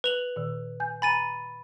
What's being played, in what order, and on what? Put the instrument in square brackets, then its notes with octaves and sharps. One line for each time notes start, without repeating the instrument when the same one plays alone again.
[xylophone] B4 F7 F#7
[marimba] A#2 D#3
G#5 G6
[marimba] G#5 A#5 [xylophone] B5 A6 D#7